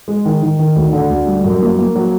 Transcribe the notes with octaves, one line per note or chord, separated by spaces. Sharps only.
G#3
D#3
D#3
D#3
D2
D3
D2
G3
F#2
A#3
A#3
F#3